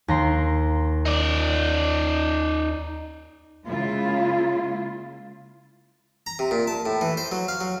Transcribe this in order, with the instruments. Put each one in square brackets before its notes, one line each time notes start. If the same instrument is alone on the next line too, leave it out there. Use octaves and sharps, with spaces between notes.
[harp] D#2 A#5 C6
[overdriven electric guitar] D#4 D5
[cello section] C#3 G#3 A#3 E4 F4
[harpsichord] A#5
C3
A#2
A5
A2
E3
C5
F#3
F5
F#3